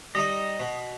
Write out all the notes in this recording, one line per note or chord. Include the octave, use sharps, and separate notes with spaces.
G3 D#4 D#5
B2